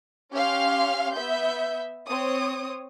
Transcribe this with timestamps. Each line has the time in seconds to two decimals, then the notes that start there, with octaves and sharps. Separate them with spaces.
0.33 C#4 G4 F5 C6 F6
1.14 B3 E5 G6
2.06 C4 C#5 D#6